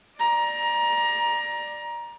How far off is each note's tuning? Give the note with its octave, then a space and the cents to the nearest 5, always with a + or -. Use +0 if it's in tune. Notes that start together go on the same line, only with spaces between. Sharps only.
D5 +20 A#5 +20